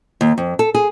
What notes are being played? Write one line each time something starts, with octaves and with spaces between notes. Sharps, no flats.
D#2
F2
A4
G#4